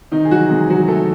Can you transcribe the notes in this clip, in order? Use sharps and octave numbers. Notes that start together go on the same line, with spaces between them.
C3 D#3 D#4
G#4
E3 F#3 F#4
C3 G#3 G#4
E3 F#3 F#4
E3 A3 A4